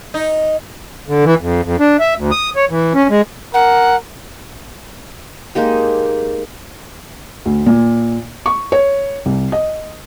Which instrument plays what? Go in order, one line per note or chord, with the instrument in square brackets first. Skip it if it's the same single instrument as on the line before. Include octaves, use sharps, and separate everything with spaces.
[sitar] D#4
[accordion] D3
E3
F2
F2
D4
E5
D2
D#6
C#5
E3
C#4
G#3
[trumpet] A#4 [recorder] F#5
[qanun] G#3 A#3 D#4 G4
[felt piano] D2
A#2
C#6
C#5
C2
D#5